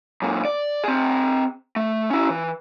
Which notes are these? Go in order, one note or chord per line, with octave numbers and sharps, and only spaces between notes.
F#2 A#2
D5
C4 G#4
A3
C#4 E4
E3